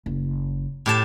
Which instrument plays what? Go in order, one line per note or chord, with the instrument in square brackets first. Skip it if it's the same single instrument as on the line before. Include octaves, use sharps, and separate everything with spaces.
[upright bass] F#1
[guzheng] A2 G4 A5